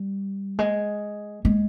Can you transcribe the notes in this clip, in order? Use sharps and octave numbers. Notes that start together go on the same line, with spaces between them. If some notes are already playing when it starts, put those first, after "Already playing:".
Already playing: G3
G#3
G#3